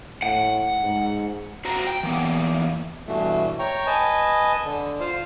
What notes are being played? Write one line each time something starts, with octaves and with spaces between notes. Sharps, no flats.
A2 F#5
G#2
F#4 C5 A#5
G5
E3 A#3 B3
G2 B2 E3 A3
C#5 G5 A#5 C#6
B4 D#5 G#5 A5
D3
F4 C5 F5